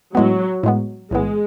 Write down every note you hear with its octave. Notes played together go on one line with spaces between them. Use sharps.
A2 F#3 G#3 B3
A2 G#3 B3
B1 A2 E3 G#3 B3